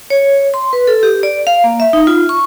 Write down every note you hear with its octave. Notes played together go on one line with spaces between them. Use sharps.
C#5
C6
B4
A4
G4
D5
F5
A#3
E5
D#4
F4
C#6